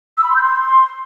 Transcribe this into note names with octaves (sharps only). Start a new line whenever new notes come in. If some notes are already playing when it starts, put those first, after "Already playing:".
E6
B5
C6
G6
C6